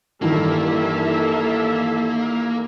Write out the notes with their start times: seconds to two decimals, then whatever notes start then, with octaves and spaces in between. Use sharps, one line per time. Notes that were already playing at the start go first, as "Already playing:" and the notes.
0.22 G2 D#3 E3 A#3 A4 E5